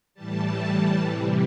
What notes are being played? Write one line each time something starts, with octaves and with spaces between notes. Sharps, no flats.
A2 E3 G3 A5
C3 E3 G3